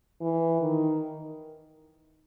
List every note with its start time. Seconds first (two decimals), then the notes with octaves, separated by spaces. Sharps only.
0.21 E3
0.61 D#3